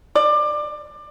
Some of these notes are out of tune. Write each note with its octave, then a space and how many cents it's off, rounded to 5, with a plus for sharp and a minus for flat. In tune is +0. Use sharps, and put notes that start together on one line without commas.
D5 +25